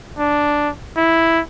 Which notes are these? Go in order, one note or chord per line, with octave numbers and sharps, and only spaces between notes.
D4
E4